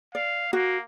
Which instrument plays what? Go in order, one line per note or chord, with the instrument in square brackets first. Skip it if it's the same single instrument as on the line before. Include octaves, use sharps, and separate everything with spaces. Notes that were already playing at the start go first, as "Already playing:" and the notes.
[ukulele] D5 [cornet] F5
[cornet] A#3 [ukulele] F#4